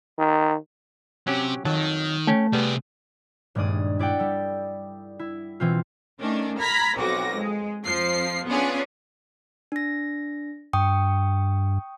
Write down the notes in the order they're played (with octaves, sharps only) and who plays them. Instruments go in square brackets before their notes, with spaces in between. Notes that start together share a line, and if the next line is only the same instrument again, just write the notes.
[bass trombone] D#3
[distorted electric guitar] C3 [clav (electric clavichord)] F#3 C#4 G4
[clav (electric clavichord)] F2 F#3 A5 [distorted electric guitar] D#3
[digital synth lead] A3 [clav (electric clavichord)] C#4 G5
[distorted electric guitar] C3 G#4 [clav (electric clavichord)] G3 B3
[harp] D#1 G2 G#3 D5 D#6
E4 D5 F#5 G5
G3 A4
E4
B2 E3 C4 F4
[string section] D#3 A3 C#4 D4
A#5 B5 F6 G#6 B6
B1 F2 F#4 D6 A#6
G#3 G#4
F2 F3 C7
B3 C#4 D4 F4 G#4
[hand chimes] D4 A#6
[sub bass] G2 [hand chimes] G5 C#6 D#6